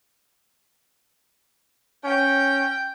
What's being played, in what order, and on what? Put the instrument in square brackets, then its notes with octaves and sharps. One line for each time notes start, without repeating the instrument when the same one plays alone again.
[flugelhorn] C#4 [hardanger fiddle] G5